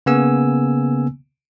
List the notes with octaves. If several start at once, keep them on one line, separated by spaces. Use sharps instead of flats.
C#3 A#3 B3 G#5 E6